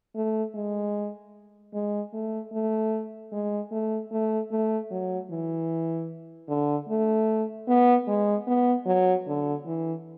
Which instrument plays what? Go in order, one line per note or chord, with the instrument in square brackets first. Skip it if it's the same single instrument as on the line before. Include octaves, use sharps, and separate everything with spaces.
[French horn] A3
G#3
G#3
A3
A3
G#3
A3
A3
A3
F#3
E3
D3
A3
B3
G#3
B3
F#3
D3
E3